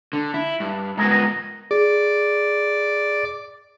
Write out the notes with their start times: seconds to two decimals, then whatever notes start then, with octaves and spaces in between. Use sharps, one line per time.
0.13 D3
0.34 E4
0.60 G2
0.97 G#2 B3 D#4 G#4 A#4
1.11 A#4 D#5
1.71 G#4 D5